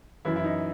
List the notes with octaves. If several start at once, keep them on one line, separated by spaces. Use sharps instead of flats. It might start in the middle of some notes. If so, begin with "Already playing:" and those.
F#2 E3 E4
E4
D#4